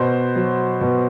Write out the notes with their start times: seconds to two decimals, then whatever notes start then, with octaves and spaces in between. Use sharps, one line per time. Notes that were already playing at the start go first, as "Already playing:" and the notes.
Already playing: B2 C5
0.36 F#3
0.81 B2